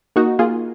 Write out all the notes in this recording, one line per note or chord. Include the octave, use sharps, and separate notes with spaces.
A#3 D#4 F#4
A#3 F4 G#4